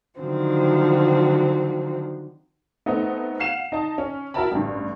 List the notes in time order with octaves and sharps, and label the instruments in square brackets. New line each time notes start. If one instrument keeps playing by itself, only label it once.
[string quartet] D3 D#3 F3 F#3 C4
[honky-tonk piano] A3 B3 C4 D#4
F5 F#5 C7 E7 F7
D#4 D#5 A5
C#4
E4 F#4 A#4 E5 A5 B5
A1 G2